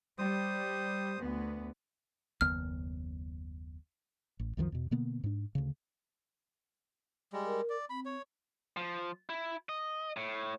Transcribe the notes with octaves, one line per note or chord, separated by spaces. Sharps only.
G3 C5 D#6
D2 B3
F#1 D#2 B3 F6
A1
C2 F#2 D#3 F3
E2 B2
B2 D3 A#3 B3
G#2 D4
D2 C#3
G3 G#3
A#4
D5
C4 B5
C#5
F3
E4
D#5
A2